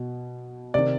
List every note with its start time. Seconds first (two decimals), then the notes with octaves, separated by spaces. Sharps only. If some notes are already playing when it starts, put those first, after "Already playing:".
Already playing: B2
0.74 C3 D#3 D5